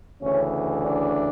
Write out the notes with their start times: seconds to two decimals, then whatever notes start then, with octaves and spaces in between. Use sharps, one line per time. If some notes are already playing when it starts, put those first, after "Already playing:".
0.22 D2 C#3 E3 C#4
0.84 D4